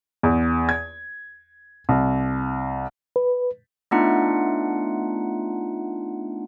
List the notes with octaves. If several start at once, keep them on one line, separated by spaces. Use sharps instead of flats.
E2
G#6
C2
B4
A3 B3 D4 D#4 F4 F#5